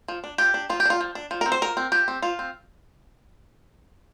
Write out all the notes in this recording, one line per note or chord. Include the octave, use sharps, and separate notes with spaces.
F3
D4
F3 G4
D4
F3 F4
G4
D4
F4
F3
D4
F3
A#4
C4
C5
F3 A#4
C4
F3 G4
C4
F3 F4
C4